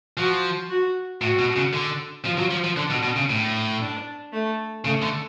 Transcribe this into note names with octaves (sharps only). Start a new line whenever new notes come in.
F3 F#4
F#4
A2 F#4
B2
C#3
D3
F3 F4
F#3
F3
F3
D3 D4
B2
B2
C#3
A2
D4
A3
C#3 A3
D3